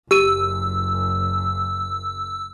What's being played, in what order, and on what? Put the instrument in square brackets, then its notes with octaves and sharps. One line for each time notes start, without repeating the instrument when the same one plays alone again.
[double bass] F#1 F#2 [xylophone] G4 D#7 [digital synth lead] E6